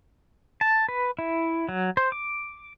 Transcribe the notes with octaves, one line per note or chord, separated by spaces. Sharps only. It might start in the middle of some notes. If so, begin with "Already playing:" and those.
A5
B4
E4
F#3
C5
D6